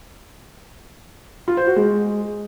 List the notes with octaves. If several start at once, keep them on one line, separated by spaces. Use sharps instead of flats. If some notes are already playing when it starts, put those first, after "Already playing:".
F4
C5
F#4
G#3